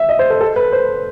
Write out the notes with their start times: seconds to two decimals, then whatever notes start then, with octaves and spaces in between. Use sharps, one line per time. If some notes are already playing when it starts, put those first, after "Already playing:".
Already playing: E5
0.09 D#5
0.19 C5
0.30 A4
0.41 A4
0.56 B4
0.73 C5